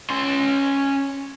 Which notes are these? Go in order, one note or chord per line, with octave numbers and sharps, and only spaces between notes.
C#4 C6